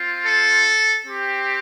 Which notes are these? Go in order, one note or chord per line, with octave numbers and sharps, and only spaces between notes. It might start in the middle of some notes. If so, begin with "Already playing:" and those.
Already playing: C4 F4
A4
C4 G4